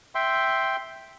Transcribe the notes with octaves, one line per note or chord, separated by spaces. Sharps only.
E5 G5 C6